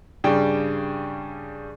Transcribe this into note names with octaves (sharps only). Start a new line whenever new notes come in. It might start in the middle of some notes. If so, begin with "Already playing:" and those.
G2 C#3 G3 G5